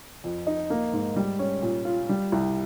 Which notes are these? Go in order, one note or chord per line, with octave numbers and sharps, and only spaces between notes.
F2
D#4
A#3
G#2
G3
C#4
A#2
F4
G3
C2